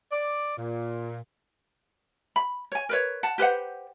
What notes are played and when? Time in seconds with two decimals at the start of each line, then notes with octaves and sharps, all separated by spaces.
0.12 D5
0.57 A#2
2.36 B5
2.72 C#5 G#5
2.89 A#4 B4 C#5
3.23 F#5 A5
3.38 G4 B4 C5 F#5